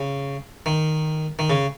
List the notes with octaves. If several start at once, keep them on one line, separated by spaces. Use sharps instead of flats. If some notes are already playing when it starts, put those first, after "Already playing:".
Already playing: C#3
D#3
D#3
C#3